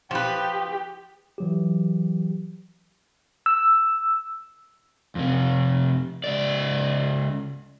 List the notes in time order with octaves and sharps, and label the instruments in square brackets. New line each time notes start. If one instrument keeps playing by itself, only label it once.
[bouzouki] F3 B4 [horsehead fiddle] G4
[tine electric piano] E3 F#3 G4
[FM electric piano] E6
[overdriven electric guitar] F2 C3
C#2 D5